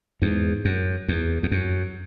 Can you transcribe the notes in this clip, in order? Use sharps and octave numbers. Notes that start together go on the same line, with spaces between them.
E2 G#2
F#2
E2
E2
F#2